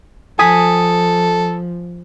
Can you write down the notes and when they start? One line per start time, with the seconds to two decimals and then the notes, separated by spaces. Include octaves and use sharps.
0.39 F3 A4 G#5 D#6 B6